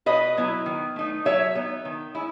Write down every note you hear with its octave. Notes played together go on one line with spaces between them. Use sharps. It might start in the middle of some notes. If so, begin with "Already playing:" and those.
B2 B4 D#5
F#3 B3 E4
D#3
A3 D#4
F#3 C#5 E5
B3 D#4
D#3
G#3 C#4 E4